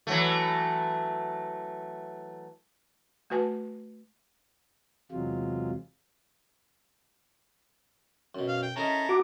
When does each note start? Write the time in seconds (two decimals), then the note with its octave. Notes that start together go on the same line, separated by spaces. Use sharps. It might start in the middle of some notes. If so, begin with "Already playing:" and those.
0.07 E3 F#3 A3
3.30 A3 F#4 B4 G#5 A5
5.11 E2 C3 F#3 G#3 F4
8.35 F#2 B2
8.48 F5
8.62 G5
8.76 C#4 E4 A4 A#4 D#5 A#5
9.09 F#4 D6